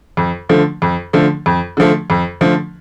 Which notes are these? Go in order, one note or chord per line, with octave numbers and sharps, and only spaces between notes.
F2
D3 F3 A3
F2
D3 F3 A3
F2
D3 F3 A3
F2
D3 F3 A3